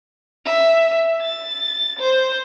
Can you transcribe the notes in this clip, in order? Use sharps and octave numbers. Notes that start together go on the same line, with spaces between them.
E5
A6
C5